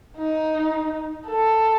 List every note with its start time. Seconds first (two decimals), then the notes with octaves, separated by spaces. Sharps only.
0.17 D#4
1.26 A4